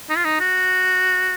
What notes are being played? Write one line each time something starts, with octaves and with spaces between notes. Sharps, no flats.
D#4
F4
D#4
F#4